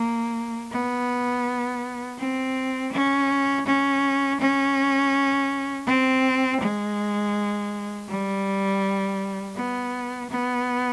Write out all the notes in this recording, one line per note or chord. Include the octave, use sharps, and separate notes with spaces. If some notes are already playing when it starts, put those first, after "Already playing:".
Already playing: A#3
B3
C4
C#4
C#4
C#4
C4
G#3
G3
B3
B3